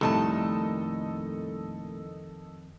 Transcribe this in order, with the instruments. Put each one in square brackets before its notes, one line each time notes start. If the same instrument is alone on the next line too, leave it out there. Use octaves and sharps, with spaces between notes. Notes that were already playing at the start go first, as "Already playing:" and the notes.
[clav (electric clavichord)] C2 [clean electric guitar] F2 D#3 [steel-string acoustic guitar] A#2 A3 A5 [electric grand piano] A4 D#5